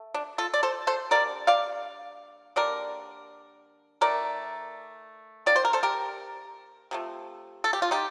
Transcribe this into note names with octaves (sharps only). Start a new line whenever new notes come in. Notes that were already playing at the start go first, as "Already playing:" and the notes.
Already playing: A3
D4
F4 A4
D5
A4 C5
A4 C5
D3 G3 A#3 A#4 D5
D5 F5
D3 G3 A#3 A#4 D5
D#3 A3 A#4 D5
D#3 A#3 D5
C5
A#4
A4 C5
G4 A#4
C3 F3 A3
A4
G4
F4
D#4 G4